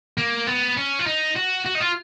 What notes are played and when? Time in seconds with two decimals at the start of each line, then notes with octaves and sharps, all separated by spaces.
0.17 A#3
0.47 B3
0.77 C#4
0.99 F4
1.06 D#4
1.36 F#4
1.66 F#4
1.75 D#4
1.80 F4